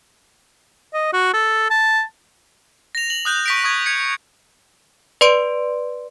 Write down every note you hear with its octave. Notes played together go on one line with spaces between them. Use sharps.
D#5
F#4
A4
A5
A#6 F7
F#7
D#6 F#6 G6
C#6 B6 D7
C#6 D#6 G#6
G#6 C#7
B4 D5 C6 D7